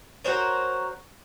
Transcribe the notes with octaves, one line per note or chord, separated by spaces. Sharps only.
F#4 A#4 C5 C#5